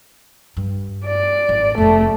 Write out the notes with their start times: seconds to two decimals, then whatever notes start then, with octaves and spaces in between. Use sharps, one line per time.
0.57 G2
1.05 D5
1.49 G#1
1.78 F1 C3 A3